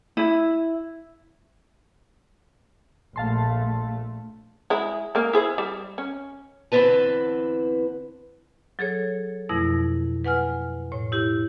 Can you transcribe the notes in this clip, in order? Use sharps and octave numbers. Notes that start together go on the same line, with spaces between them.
E4
A#1 A3 F5 A5 C6
G#3 E4
G#3 A#3
E4 G#4 C5
G3
C#4
E2 D3 C4 E4 B4 A5
F#3 G#4 A4 C#5
F2 B2 F3 A3 E4 A#6
B4 F#5 G#5 F6
A2 C#5
E4 G4